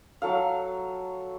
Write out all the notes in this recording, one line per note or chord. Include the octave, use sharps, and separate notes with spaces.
F#3 A4 F5